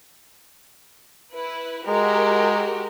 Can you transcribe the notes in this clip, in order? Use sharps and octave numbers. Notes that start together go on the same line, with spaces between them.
E4 B4
G#3 F#4 G4 A#4